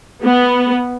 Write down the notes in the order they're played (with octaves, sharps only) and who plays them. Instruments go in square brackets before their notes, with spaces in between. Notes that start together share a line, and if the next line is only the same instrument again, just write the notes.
[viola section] B3